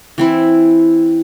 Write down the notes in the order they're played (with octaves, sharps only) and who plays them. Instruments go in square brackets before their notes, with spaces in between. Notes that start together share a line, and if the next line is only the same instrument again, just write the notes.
[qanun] E3 C4 E4